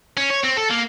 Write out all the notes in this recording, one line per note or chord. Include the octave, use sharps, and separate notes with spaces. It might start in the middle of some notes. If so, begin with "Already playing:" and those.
C#4
C#5
C4
A4
A#3